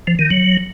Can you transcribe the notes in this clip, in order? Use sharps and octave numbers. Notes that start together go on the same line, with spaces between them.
F3
D#3
F#3